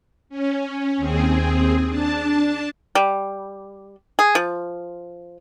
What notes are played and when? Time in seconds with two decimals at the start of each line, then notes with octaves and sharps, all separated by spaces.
0.29 C#4
0.97 D#2 C4 G#4
1.89 D4 A5
2.95 G3
4.19 G#4
4.35 F3